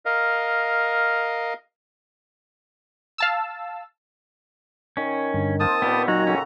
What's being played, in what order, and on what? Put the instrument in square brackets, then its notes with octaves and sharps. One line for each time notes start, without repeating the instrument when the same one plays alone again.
[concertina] A#4 D#5 F5
[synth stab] F5 A5 E6
[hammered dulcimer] D#3 [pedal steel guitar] C#4
[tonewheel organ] G2 D3
[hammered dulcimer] A#3 C4 C5 [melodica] A5 D#6
[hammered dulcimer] A#2 C4 [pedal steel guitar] B3 G4 [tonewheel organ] B4
[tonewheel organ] F#3 D#4 G#5 [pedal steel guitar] F#4 [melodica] A#5
[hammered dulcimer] C#3 F#4 A4 [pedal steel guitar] C#4